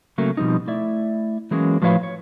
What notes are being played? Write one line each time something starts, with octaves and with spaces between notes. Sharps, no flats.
C#3 F#3 A3 A#3
B2 F3 G3 C4 D#4
A3 E4 D5 E5
E3 F#3 G#3 A#3 C#4
A2 F3 F#4 B4 C#5 F5
C#5